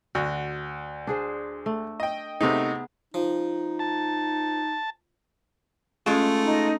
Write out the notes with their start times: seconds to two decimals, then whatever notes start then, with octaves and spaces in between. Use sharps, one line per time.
0.15 D2 F#4
1.07 D4 G#4 C5
1.66 A3
2.00 D#5 G5
2.41 C3 A3 B3 D#4 G#4
3.14 F3 D#4
3.79 A5
6.06 G#3 A3 C#4 F4
6.43 D#4